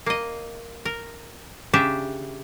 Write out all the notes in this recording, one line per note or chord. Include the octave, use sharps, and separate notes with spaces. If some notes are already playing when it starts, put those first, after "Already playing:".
A#3 D#5
A#4
C#3 D4 G4 E5